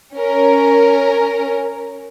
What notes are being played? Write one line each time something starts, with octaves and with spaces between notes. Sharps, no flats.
C#4 A#4